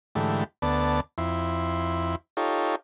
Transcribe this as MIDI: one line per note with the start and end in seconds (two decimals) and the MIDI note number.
0.15 0.44 44
0.15 0.44 50
0.15 0.44 52
0.15 0.44 57
0.15 0.44 67
0.62 1.00 38
0.62 1.00 59
0.62 1.00 74
0.62 1.00 81
1.18 2.16 41
1.18 2.16 64
1.18 2.16 84
2.37 2.75 63
2.37 2.75 65
2.37 2.75 67
2.37 2.75 69
2.37 2.75 73